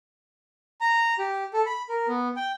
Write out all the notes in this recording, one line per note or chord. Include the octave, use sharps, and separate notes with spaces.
A#5
G4
A4
B5
A#4
B3
G5